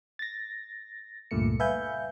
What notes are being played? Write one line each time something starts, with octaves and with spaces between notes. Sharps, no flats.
A6 A#6
C#2 G2 A#2 A3 C#7
B4 E5 F5 G#5 G6